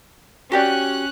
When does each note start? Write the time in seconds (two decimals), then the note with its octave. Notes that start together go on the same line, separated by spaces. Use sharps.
0.52 C#4 F#4 G4 D5 F#6